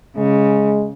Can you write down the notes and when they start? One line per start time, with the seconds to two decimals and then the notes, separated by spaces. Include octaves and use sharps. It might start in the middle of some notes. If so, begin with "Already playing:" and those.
0.17 C#3 G#3